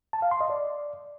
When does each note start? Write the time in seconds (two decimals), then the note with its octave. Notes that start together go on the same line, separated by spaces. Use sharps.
0.13 A5
0.22 F5
0.31 C6
0.41 D#5
0.50 D5